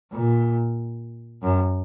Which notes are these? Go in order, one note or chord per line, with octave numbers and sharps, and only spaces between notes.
A#2
F#2